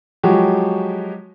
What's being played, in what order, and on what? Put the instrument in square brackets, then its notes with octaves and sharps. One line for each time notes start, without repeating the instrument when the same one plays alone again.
[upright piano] F3 F#3 G#3 F#4 G4